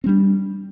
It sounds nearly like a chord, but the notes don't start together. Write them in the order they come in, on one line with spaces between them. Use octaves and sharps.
C4 G3 D4